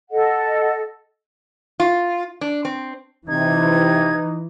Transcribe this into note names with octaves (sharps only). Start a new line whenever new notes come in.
A4 D#5 F#5
F4
D4
C4
C3 E3 D#4 G#6